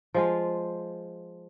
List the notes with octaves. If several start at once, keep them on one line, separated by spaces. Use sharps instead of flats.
F3 G#3 F4